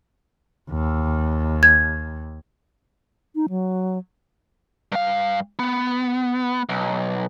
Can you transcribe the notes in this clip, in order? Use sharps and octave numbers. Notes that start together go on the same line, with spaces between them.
D#2
G#6
D#4
F#3
G2 F5
B3
B1